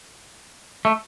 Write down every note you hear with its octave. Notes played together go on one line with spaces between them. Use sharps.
A3